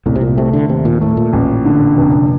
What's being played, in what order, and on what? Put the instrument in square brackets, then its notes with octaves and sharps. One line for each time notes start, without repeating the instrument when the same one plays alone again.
[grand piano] C2 [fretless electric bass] A2
[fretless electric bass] C3
A#2
[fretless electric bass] C3 [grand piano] A3
[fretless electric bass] D3
[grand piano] D#2 [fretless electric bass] C3
[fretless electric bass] A#2
[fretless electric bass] A2 [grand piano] A3
[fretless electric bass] A#2
[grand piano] A1
D3
F1